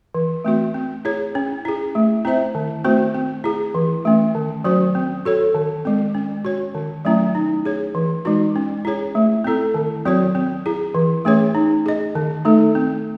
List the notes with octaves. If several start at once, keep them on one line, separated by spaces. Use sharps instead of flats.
E3
A3 C4 F#4
C4
E4 G#4 C#5
C#4
E4 G#4
A3
C4 E4 C5 E5
D#3
A3 C4 F#4 C5
C4
E4 G#4
E3
A3 C#4
D#3
F#3 C#4 F#4 C5
C4
F#4 A4 C#5
D#3
G#3 C4
C#4
F#4 C#5
D#3
F#3 A3 C#4 E4
D#4
G#4 C#5
E3
G#3 D#4 F#4
C#4
E4 G#4 C#5
A3
C4 E4 A4
D#3
F#3 C4 F#4 C#5
C4
E4 G#4
E3
A3 C#4 G#4 C#5
D#4
G#4 D#5
D#3
A3 D#4 A4
C4